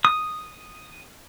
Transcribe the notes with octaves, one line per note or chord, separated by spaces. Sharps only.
D#6